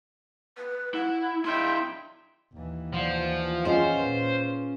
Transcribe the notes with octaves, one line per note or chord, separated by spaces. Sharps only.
B4
E4 F#5
E4 D#5 E5 G5 C6
D#2 E3
F3 D5 F#5
C#4 F4 G#4 C5 D#5 F#5 G#5
A#2 B4 C6